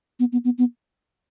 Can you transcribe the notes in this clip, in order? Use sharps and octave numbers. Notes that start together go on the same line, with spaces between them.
B3
B3
B3
B3